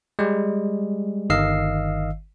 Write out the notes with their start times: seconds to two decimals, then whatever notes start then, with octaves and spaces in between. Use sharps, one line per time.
0.19 G3 G#3
1.30 G1 D#3 D#5 F5 E6 C7